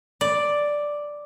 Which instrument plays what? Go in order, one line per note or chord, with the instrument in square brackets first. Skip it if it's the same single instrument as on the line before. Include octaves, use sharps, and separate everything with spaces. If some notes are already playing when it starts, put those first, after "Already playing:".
[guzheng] D5